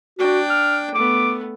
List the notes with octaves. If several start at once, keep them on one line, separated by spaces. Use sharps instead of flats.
D4 F#4 G5
F6
A3 B3 D6